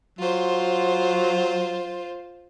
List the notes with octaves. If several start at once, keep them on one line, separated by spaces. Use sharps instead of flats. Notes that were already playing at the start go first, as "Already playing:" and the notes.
F#3 F4 C5